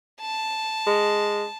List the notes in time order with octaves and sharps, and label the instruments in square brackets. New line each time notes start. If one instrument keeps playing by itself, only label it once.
[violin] A5
[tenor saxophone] G#3